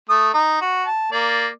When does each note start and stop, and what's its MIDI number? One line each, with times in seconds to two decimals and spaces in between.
0.09 0.30 57
0.09 0.30 87
0.34 0.57 63
0.61 0.84 66
0.86 1.08 81
1.12 1.48 58
1.12 1.48 74